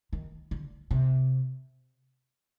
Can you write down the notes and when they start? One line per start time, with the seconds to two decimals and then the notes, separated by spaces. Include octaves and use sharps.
0.13 D#3
0.51 D3
0.91 C3